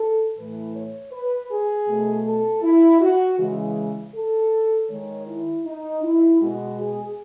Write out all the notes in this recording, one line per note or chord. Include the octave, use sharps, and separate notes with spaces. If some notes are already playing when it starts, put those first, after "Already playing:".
Already playing: A4
A2 E3 A3 B4
C#5
B4
G#4
B2 A3
A4
E4
F#4
C#3 E3 G#3
A4
D#3 G#3 C#5
E4
D#4
E4
B2 G#3 F#4
G#4